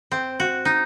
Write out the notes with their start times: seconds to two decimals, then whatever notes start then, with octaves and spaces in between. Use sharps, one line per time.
0.12 C4
0.40 F#4
0.65 D#4